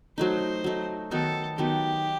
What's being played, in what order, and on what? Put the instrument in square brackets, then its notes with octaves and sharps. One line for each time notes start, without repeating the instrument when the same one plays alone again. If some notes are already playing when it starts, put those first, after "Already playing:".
[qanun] F#3 A3 D#4 [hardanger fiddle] C5
[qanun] F#3 A3 D#4
[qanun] D#3 F#3 B3 D#4 [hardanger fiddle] A4
[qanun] D#3 F#3 B3 D#4 [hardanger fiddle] G4